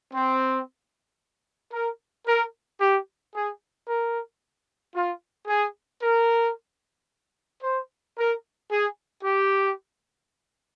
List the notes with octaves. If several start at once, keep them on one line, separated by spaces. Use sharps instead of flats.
C4
A#4
A#4
G4
G#4
A#4
F4
G#4
A#4
C5
A#4
G#4
G4